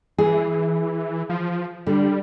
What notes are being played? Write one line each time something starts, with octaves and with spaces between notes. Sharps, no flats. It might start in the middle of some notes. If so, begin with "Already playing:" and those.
E3 G#4
F3
D3 G3